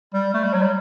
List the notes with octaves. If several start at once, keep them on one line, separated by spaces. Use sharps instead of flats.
G3
A3
G3
F#3
G3